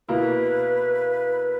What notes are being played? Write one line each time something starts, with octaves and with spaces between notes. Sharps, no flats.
B2 A#3 E4 B4